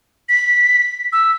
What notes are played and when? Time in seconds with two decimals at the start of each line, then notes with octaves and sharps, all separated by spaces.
0.29 B6
1.13 E6